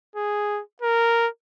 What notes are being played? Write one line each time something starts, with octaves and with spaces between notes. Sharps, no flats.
G#4
A#4